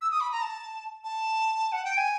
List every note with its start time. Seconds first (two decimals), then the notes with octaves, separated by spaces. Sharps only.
0.01 E6
0.11 D#6
0.21 B5
0.32 A#5
0.42 A5
1.04 A5
1.72 F#5
1.84 G5
1.97 G#5